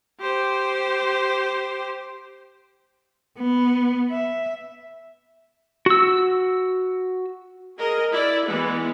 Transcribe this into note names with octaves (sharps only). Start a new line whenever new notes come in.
G4 C5
B3
E5
F#4 E6
G#4 A#4 D#5
E4 D5
E3 G#3 B3